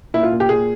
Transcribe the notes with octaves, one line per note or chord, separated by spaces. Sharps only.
A#2 E4
F4
A#2
G4
A#2 G#4